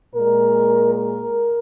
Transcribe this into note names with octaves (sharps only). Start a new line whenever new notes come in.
A#2 G#3 A#4
A#4